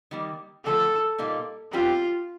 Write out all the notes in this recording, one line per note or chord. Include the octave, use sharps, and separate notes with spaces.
D#3 G3 A#3
D3 F3 A3 A4
A#2 G3 A#3 D#4
G3 C4 F4 G4